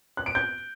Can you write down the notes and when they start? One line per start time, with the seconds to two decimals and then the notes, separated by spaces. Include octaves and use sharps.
0.17 F#6
0.26 D7
0.35 G6